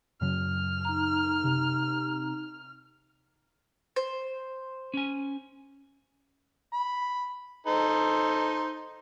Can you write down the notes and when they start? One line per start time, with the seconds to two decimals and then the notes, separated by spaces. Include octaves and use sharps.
0.21 F#2 C#3 F#3 F6
0.85 D#4 A#5
1.44 C3
3.96 C5
4.94 C#4 G#5
6.73 B5
7.67 D#4 A4 C5